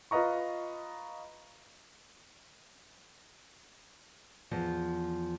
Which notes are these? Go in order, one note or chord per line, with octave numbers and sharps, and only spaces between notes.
F4 B4 D#5 A#5 C#6
E2 F3